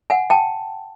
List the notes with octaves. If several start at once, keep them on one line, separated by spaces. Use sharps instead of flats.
F#5 G#5
G5 A5